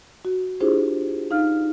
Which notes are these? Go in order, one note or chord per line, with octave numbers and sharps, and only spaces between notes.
F#4
D4 E4 F4 G4 G#4 C5
D#4 F5 F6